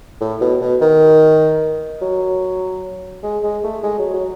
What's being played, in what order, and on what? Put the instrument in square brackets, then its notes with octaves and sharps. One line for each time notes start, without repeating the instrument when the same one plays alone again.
[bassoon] A2
B2
B2
D#3
F#3
G#3
G#3
A3
G#3
F#3
F#3